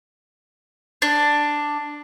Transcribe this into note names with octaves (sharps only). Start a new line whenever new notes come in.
D4